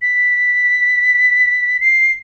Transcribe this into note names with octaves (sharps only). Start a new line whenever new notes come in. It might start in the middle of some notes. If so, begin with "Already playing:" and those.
B6
C7